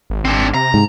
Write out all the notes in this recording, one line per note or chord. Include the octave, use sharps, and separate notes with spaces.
G#1
G#1 C4 D4
C3 A#5
G#2